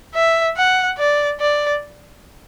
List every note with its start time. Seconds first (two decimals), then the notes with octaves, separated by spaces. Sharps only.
0.15 E5
0.57 F#5
0.98 D5
1.40 D5